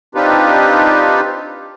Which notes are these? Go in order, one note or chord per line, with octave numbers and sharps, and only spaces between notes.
C4 D4 D#4 F4 G4 B4